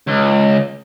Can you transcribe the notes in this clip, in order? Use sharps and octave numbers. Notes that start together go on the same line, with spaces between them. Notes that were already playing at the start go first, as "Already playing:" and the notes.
C#2